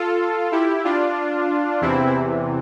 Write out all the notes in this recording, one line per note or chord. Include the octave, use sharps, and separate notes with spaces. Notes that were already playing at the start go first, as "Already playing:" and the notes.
Already playing: F4 A4
E4 G4
D4 F4
E2 C3 E3 C4 E4